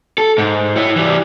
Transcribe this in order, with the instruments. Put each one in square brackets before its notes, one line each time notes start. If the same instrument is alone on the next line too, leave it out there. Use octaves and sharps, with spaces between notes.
[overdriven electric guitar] A4
G#2
E4 C#5
E3 G3